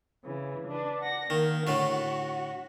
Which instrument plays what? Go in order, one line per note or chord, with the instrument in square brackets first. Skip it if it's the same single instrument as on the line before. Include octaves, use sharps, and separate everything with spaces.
[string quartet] C#3 E3
D4 B4
F#5 A#6
[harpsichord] D#3 [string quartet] A#3
[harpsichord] A2 D3 A3 [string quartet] F#4